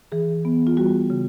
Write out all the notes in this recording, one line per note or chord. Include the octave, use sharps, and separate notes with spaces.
E3 G#4
B3
F4
G3 F#4
C#3